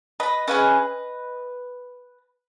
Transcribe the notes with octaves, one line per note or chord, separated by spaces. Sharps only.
B4 D#5
C#4 E4 G#4 B4 D#5